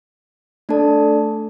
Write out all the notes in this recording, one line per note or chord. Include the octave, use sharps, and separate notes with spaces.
A3 D4 A4 D5 A5